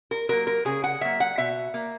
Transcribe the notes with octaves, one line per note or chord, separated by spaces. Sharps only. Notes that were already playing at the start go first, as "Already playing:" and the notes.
A#4
F#3 A#3 A#4
A#4
C#3 G#4
F#5
F#3 A#3 E5
F#5
B2 E5
A#3